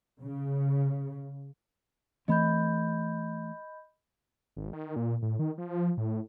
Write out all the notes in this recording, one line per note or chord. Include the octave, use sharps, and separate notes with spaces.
C#3
E3 A3 C4 D#5 B5 G6
G#1
D#3
A#2
A2
D#3
F3
A2